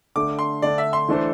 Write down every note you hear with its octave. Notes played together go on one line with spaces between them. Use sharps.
D3 A3 D4 D6
C6
D3 A3 D4 D5
E5
C6
E3 A3 D4 A4 C5